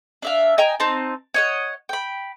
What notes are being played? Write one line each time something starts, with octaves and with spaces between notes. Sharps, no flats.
D4 E5 F5
D#5 G5 G#5 A#5
C4 D#4 A5
C#5 D#5 F#5
G5 B5